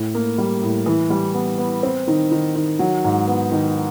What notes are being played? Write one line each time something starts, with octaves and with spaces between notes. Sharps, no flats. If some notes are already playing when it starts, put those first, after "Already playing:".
Already playing: A2
A#3
G3
A2
E3
G3
B3
B3
C4
D#3
D#3
D#3
F#3
G#2
B3
D#3